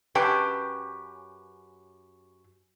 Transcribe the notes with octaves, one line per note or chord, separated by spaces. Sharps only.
F#2 C#4 G4 B4 G5 A5